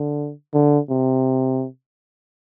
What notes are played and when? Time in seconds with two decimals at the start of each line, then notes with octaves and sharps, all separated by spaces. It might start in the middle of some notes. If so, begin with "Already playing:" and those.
Already playing: D3
0.54 D3
0.90 C3